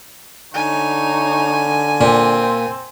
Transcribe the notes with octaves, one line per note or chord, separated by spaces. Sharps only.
D3 D#4 C#5 G#5
A#2 C4